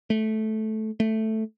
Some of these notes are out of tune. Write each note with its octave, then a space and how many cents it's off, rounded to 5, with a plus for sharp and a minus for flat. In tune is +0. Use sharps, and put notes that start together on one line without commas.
A3 -10
A3 +0